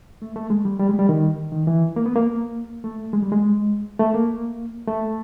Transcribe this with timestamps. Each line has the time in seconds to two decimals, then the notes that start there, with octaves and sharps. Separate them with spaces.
0.22 A3
0.36 A3
0.50 G#3
0.65 G3
0.80 G3
0.89 G#3
0.99 G3
1.09 D#3
1.52 D#3
1.67 E3
1.96 A#3
2.06 B3
2.16 A#3
2.84 A3
3.13 G#3
3.22 G3
3.32 G#3
4.00 A3
4.14 A#3
4.87 A3